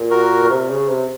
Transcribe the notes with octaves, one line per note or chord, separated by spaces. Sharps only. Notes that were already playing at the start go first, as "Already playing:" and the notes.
Already playing: A#2
F#4 A#4
A#2
C3
C#3
C3